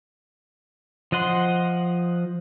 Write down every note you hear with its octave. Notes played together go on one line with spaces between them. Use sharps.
F3 D#5 F#5 C6